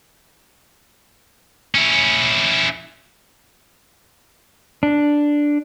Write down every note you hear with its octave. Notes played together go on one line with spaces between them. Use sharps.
C#4 E4
D4